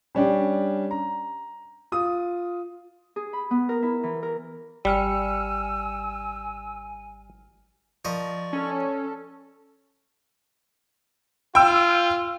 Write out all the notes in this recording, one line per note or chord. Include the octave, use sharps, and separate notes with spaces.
G3 C#4 D4 G4
A#5
F4 D#6
G#4
B5
B3
A#4
E4
E3
A#4
G#1 G3 G#5 E6 F6 C#7
F3 A#4 D5 D#5 C#6
C#4 A4
F4 G5 E6